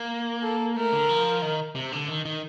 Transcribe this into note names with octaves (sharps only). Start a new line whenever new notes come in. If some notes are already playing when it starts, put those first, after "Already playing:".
Already playing: A#3
A4
A3 A#4
D3
F3
D#3
C3
D3
D#3
D#3